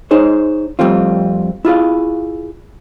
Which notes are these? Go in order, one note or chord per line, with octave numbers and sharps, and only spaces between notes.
D#4 G#4 C5 C#5
F2 G3 A3 C4 F4
E4 F4 G#4 F5